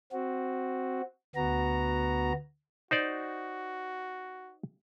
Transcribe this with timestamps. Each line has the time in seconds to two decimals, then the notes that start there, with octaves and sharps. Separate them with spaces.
0.12 C4 F#4
1.35 D2 B3 F#4 A#5
2.91 D#4 F#4 C5 D5